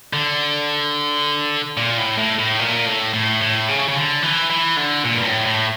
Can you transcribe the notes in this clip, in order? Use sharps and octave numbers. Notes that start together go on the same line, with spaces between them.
D3
A#2
A2
A2
A2
A#2
A2
A2
A2
C#3
C#3
D3
E3
E3
D3
A#2
G2
A2
A2